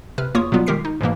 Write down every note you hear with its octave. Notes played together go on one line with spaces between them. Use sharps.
C3 B4 F6
E2 A#3 F4 C#5 C#6 D#6
B2 F#3 G3 B3 F4
D#3 G#3 G4 A#4 B6 C7
D#4
G#2 B2 E3 A#3